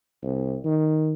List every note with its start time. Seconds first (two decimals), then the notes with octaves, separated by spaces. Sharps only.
0.22 C2
0.64 D#3